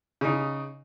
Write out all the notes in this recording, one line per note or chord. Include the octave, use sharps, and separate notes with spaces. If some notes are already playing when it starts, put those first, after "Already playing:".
C#3 D#4